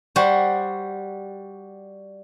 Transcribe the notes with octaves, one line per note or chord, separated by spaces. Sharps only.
G3 F#4 C5